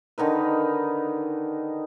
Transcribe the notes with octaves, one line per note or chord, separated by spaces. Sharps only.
D3 D#3 D#4 B4